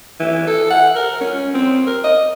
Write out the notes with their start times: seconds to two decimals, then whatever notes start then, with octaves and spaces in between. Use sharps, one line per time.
0.20 E3
0.48 A4
0.71 F#5
0.96 A#4
1.21 C#4
1.54 C4
1.87 A#4
2.04 D#5